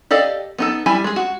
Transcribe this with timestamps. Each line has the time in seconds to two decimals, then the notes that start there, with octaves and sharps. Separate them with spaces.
0.11 G4 A4 D5 D#5 F5
0.58 B3 D#4 A4
0.86 G3 E4 G4 G#5
1.04 G#3 G#4
1.16 F#4